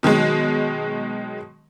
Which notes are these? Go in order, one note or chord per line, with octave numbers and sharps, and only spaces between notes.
B2 D#3 F#3 G#3